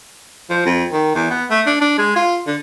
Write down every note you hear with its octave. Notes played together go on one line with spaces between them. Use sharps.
F3
F2
D#3
E2
B3
A3
D4
D4
G#3
F4
D3